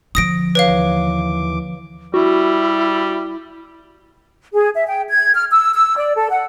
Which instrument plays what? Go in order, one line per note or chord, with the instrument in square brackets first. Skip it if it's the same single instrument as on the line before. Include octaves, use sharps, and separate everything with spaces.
[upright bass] D3 F3 [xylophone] D#6 A#6 D7
[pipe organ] D#2 E3 D6 [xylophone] B4 C#5 F5
[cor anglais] G3 [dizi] E4 [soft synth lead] F#4
[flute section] G#4
E5
G5
G#6
F6
E6
E6
D5
A4
F#5